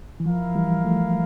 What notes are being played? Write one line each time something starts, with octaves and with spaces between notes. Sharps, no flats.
E3
F3 E4 A#4 F5
E3 G3
F3 A3